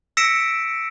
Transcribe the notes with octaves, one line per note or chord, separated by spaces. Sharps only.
E6 A#6 B6 C#7 D7 E7